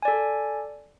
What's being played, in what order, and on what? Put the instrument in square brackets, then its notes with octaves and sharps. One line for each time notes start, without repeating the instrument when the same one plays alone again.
[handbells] G#5
D5
A4